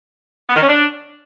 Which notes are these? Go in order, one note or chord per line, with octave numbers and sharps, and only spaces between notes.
B3
D#3
C#4
D4